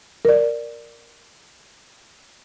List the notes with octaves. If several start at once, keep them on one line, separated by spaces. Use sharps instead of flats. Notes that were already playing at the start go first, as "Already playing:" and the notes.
A#4 D5